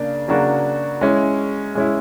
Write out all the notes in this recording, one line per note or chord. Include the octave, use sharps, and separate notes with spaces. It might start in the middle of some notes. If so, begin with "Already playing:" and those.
Already playing: C#3 A#3 D4
C#3 F#3 A#3 D4 F#4
G#3 C#4 E4
G#3 C#4 E4